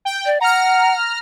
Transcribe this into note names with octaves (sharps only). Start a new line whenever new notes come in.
G5
D5
F#5 A#5 F6